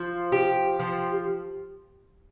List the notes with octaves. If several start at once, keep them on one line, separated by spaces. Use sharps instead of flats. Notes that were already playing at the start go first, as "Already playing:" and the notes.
Already playing: F3
G4
F3